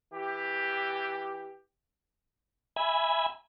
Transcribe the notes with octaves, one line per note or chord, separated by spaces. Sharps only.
E3 G4
E5 G#5 B5